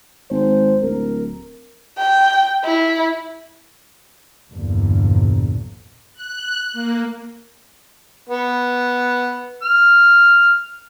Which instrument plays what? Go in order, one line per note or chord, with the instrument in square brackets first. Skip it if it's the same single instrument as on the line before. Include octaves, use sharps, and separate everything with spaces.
[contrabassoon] G#1 [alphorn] C5
[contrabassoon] D1 [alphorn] A#4
[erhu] G5
E4
[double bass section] A#1 E2 G2 B2 D3 A#3
[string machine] F#6
A#3
[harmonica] B3
F6